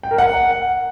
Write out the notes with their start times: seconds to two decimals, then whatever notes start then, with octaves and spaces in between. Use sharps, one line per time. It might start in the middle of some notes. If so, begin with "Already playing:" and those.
0.03 G5
0.11 A#4
0.18 F#5